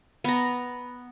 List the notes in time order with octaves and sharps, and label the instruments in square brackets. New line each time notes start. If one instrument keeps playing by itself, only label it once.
[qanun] B3 A#5